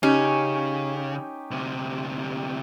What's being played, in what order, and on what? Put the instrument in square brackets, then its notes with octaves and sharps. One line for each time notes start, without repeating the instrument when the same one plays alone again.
[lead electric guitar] C#3 [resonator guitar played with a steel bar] C#4 [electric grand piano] D#4 G4 G5
[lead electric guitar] D2 C3